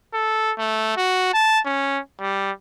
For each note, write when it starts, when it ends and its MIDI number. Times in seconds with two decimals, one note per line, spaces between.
0.14 0.52 69
0.58 0.97 57
0.97 1.31 66
1.33 1.59 81
1.66 1.99 61
2.20 2.51 55